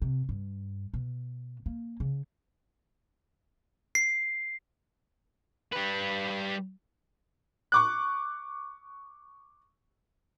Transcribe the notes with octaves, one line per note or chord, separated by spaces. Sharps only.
C3
G2
B2
A#3
C#3
C7
G3 B4
C#6 D6 F#6